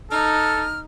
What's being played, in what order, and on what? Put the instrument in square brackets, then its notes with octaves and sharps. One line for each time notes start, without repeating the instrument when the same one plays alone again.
[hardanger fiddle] D#4 [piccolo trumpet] A4 [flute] F6